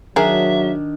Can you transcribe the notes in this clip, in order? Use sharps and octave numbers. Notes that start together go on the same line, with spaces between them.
D#3 F#3 D4 G#4 A#4 E5